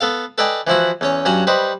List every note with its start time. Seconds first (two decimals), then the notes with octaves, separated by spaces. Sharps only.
0.01 B3 A4 F5
0.38 A4 B4 D5 D#5 G5 G#5
0.67 E3 F3 E4 F#4
1.01 E2 C#4 C#5
1.25 G2 F#3 C#4 F#4 G#5
1.47 G3 B4 C5 D#5